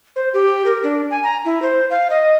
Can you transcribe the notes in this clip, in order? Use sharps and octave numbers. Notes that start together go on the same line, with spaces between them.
C5
G4
A#4
D4
G#5
A#5
E4
C5
F5
D#5